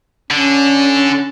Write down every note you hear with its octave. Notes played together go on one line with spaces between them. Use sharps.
D3 C#4